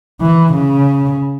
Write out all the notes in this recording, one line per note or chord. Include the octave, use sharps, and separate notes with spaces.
E3
C#3